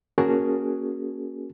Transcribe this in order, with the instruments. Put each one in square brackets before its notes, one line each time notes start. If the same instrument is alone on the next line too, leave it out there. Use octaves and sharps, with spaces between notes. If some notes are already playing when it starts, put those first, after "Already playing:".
[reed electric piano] A#3 C#4 F#4 G#4 A#4 A5